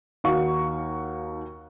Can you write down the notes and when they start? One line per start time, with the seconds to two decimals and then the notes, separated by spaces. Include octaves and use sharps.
0.24 D#2 D#4 F#4 F5 C#6